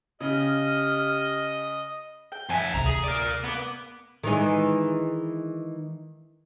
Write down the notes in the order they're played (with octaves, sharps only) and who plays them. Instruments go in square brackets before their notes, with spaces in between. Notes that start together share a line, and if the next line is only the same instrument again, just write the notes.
[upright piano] C#3 [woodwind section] G4 F6 [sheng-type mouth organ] D#5
[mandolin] G5
[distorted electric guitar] F2 E5 [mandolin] G#5 F#6
[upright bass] D2 C3 [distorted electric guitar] A#5
[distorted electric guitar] G#4
A#4 D5
[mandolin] A#3 D6 [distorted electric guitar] B3
[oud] D#3 E3 G#3